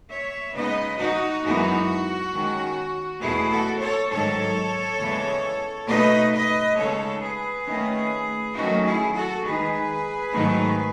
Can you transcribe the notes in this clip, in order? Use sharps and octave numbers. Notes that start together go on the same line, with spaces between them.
C#5 E5
C#3 G#3 B3 D#4 B4 D#5
D#4 F#4
F#2 E3 G#3 B3 D#4
D#3 G#3 C#4
E2 B2 A3 E4 G#4
F#4 A4
A4 C#5
G#2 D#3 F#3 A4 C#5
E2 C#3 E3 G#3
B2 A3 D#4 B4 D#5
B4 D#5
C#3 G#3 D#4 A4 C#5
G#4 B4
D#3 A3 C#4
D#3 F#3 A3 C#4 D#4 F#4
E4 G#4
F#4 A4
D#3 G#3 D#4 G#4 B4
G#2 D#3 F#3 A3 D#4